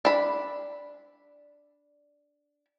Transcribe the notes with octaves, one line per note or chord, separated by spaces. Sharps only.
D4 B5